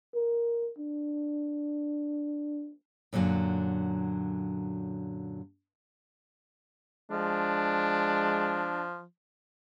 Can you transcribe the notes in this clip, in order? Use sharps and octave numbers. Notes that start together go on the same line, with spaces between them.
A#4
D4
F#2 A#2 D3 E3 F#3
F3 G#3 D4